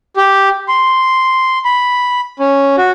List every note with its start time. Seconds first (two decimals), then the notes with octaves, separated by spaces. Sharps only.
0.16 G4
0.68 C6
1.65 B5
2.39 C#4
2.78 F#4